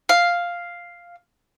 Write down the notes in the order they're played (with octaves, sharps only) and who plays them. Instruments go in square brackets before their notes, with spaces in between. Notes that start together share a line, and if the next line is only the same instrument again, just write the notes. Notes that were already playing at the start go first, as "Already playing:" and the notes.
[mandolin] F5